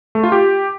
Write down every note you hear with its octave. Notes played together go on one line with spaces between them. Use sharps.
A3
F4
G4